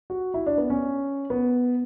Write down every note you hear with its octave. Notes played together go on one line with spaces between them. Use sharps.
F#4
E4
D4
B3
C#4
B3